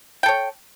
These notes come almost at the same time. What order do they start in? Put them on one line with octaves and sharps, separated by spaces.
G5 A4 C#5